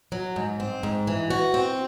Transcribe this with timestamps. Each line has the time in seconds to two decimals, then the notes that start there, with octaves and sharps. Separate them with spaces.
0.12 F#3
0.36 G#2
0.60 C4
0.83 G#2
1.07 E3
1.30 F#4
1.54 C4